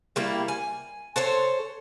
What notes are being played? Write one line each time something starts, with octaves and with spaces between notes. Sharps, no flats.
G3 A#3 E4
G#5
A4 C5 C#5